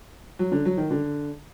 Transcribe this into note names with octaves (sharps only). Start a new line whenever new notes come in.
F#3
D3
F#3
D#3
D3